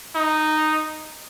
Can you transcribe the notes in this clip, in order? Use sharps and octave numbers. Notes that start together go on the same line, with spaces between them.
D#4